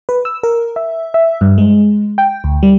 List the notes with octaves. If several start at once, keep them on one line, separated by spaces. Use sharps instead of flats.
B4
E6
A#4
E5
E5
G2
G#3
G5
D2
G3